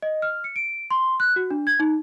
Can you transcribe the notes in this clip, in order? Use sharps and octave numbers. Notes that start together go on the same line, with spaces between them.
D#5
F6
C#7
D7
C6
F#6
F#4
D4
G#6
D#4